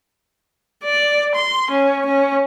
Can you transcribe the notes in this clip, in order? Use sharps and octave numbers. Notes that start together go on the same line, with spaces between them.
D5
C6
C#4
C#4